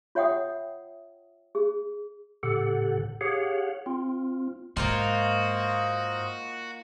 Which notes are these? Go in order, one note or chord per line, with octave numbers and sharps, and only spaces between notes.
F4 C#5 E5 F#5 G5 D#6
G#4
A2 C#3 G4 A4 F#5
G4 G#4 C#5 F5 F#5
C4 F4
G#2 A#3 D#4 F4 F#4 C5 D#5 F5